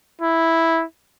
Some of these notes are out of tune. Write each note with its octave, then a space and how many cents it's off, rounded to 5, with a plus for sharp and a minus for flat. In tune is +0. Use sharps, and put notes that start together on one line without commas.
E4 -5